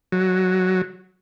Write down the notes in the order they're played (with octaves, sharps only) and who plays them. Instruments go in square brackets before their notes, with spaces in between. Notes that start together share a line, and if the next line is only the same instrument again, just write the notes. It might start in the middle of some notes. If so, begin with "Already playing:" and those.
[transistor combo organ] F#3